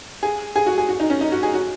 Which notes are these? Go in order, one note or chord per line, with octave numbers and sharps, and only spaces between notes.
G#4
G#4
F#4
G#4
F#4
D#4
C#4
D#4
F#4
G#4
F#4